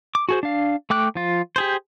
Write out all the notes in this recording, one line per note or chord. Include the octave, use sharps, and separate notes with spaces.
D6
F#4 G#4 C5
D4 F5
A3 G5 D6 F#6
F3 F4
G4 G#4 C5